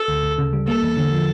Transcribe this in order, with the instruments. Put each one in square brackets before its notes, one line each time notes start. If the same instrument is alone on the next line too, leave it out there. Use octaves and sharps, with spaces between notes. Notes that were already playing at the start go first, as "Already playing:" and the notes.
Already playing: [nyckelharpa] A4
[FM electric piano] D2
D2
C#3
G3
[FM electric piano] A#3 [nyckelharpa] A4
[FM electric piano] E2
D3
F3